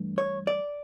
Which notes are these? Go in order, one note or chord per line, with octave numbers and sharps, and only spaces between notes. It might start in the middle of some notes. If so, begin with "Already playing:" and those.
Already playing: G2 E3 A3
C#5
D5